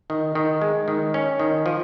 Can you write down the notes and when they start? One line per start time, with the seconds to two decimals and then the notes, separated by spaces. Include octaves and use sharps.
0.10 D#3
0.35 D#3
0.62 G#3
0.88 D#3
1.14 C#4
1.40 D#3
1.66 F3